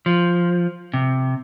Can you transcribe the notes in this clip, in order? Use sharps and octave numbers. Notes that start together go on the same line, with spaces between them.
F3
C3